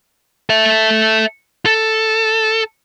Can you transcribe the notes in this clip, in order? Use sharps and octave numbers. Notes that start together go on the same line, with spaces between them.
A4 E5
A4